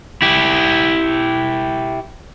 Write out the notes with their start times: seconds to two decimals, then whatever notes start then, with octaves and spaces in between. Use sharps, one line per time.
0.22 E4 G4